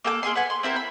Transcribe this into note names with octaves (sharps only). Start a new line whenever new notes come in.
A#3 A4 G5 D6
A#3 G#4 D#5 C6
B4 F#5 G#5
C6
C4 E4 A#4 C5
B5